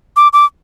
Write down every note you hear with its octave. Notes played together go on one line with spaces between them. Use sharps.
D6
D6